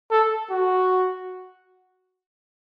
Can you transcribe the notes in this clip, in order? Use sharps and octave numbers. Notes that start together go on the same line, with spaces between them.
A4
F#4